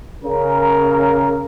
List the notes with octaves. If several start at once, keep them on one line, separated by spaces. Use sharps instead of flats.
C#3 A#4